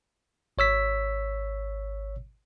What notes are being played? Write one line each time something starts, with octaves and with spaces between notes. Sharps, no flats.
G#1 C#5 E6 B6